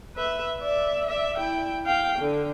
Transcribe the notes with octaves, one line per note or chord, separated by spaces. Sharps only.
B4 E5
D5 E5
D5 E5
E4 G5
F5 G5
D3